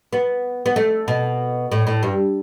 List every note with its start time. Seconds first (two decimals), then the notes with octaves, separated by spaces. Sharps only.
0.13 B3
0.66 B3
0.76 A3
1.08 B2
1.72 A2
1.87 A2
2.03 G2